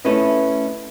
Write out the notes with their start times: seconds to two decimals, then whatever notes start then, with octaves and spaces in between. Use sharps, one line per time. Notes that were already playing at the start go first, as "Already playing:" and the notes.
0.05 A3 C#4 E4 B4 D#5